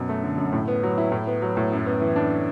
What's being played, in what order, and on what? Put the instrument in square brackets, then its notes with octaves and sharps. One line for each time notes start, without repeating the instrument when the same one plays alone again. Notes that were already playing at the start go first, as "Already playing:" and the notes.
Already playing: [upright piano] F#2 B2
A3
D3
F#2
A2
B3
F#3
E4
A2
B3
F#3
A2
F#2
B3
E3
D4